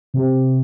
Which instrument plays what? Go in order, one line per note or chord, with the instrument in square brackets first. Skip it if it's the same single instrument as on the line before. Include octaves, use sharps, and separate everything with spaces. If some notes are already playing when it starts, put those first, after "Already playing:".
[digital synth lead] C3